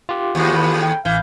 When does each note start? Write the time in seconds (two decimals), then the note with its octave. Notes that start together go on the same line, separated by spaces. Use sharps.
0.09 F4 G4
0.35 D#2 A2 F#4
0.55 B4
0.82 G5
1.05 A1 E3 F5 G6